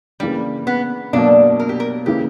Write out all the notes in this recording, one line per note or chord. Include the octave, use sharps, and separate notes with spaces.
C#3 E3 G3 A#3 D4
B3
B2 F#3 A#3 D4
A#4
G4
A#4
C#3 E3 A#3 E4 G4